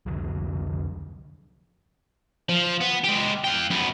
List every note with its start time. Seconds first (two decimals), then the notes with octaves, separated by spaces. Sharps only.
0.06 C2 F2 D3 F#3
2.49 F3
2.81 B3
3.04 G#3 G4
3.44 F5 G5
3.70 F#2 B3